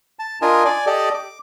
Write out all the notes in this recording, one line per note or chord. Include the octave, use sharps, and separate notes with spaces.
A5
D4 F4 A#4 D#5 G#5
D5 G#5
G4 A4 D5 D#5
D6